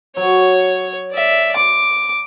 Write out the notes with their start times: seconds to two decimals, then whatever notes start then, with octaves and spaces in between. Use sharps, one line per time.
0.17 F#3 C#5
1.12 D5 E5
1.56 C6 D6